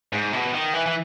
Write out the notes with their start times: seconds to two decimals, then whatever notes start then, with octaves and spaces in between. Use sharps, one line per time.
0.13 G#2
0.33 B2
0.54 D#3
0.74 E3
0.86 E3